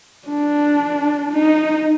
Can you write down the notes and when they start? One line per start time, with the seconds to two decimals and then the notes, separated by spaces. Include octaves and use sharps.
0.28 D4
1.32 D#4